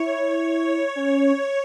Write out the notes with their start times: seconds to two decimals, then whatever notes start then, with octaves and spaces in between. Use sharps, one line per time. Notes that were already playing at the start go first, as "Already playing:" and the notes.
Already playing: E4 C#5
0.55 C#5
0.96 C#4